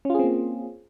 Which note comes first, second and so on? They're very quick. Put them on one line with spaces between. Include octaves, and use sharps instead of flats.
C#4 F4 G#4 C4 A#3